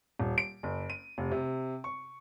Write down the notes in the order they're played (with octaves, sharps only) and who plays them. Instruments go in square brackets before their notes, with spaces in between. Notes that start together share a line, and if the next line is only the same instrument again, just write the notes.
[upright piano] D#1
D7
F#1
D#7
F1
C3
C#6